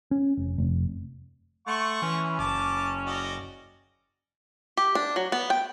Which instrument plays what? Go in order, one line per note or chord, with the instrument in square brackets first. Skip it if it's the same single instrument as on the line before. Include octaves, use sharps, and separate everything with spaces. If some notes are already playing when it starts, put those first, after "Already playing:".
[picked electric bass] C#4
F1
F1
[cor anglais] A3 [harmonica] F#5 C6 C#6
[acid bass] E3 [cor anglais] C#4
[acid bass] F#1 [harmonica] A5 D6
[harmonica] F#4 D5 D#5
[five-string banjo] G4
D4
F#3
B3
G5